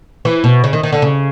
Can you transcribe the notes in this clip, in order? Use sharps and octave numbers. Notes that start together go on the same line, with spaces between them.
E3
B2
C#3
D#3
D#3
D3
C#3